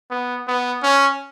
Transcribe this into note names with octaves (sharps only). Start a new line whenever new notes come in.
B3
B3
C#4